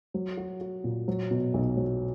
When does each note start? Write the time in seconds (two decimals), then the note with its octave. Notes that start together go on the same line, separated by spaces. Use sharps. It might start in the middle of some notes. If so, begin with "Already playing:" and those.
0.14 F#3
0.37 F#4
0.61 F#4
0.84 A#2
1.08 F#3
1.31 B2
1.54 B1
1.77 F#3